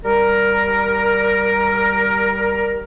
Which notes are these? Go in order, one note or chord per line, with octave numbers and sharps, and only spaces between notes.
G3 A#4